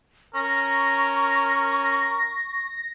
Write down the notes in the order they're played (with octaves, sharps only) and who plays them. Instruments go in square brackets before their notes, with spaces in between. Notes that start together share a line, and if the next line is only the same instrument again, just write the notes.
[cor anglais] C#4 [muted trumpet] A#4 [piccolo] C#6 [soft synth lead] A#6